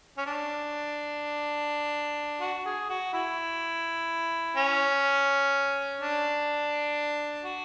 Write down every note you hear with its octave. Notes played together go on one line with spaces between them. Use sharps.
C#4
D4
F#4
G#4
F#4
E4
C#4
D4
F#4